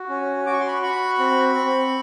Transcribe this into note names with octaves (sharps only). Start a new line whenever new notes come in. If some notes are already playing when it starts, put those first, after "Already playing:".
Already playing: F#4
C#4
F#4 D6
C#6
C6
B5 C#6
F#4 B5 C#6
C4
C4